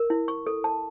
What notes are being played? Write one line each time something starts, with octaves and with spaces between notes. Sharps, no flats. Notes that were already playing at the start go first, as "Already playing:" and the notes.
Already playing: A#4
E4
C#6
A4
A5